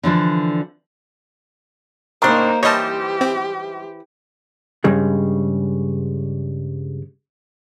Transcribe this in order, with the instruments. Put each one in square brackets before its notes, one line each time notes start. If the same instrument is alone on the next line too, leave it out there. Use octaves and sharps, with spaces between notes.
[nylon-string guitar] D3 E3 F3 D4
[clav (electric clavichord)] A2 C#3 D4 [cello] A#3 D#4 [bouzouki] A#4 C5
[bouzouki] E3 C5 [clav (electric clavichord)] G3 D#4 [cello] G4 [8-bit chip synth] C#5 D#5 A5
[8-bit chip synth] C4
[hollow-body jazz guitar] G2 C#3 G3 G#3